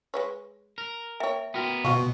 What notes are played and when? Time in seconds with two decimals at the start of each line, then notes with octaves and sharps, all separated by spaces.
0.14 G#3 B4 C#5
0.78 A#4
1.20 A#3 C#5 E5 G5
1.54 B3 F#4 A#4 G5
1.84 B2 F3 F4 F#4 C#6